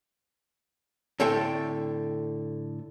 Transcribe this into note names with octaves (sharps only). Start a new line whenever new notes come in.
A2 D3 C4 A4 E5 G5